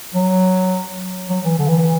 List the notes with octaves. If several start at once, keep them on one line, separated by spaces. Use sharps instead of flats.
F#3
F#3
E3
D3
E3
E3